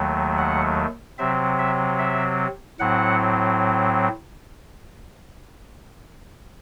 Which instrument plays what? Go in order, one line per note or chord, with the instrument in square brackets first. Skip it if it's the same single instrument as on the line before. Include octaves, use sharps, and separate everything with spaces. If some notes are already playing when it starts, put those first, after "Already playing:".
Already playing: [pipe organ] D#2 D#3 F#3 A3
F#5
C3 F#3 C4 E5
E5
E5
A2 F#3 C4 F#5